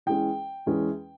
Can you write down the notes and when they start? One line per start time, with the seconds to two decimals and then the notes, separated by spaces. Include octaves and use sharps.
0.06 E2 E3 G#3 C#4 G5
0.66 E2 E3 G#3 C#4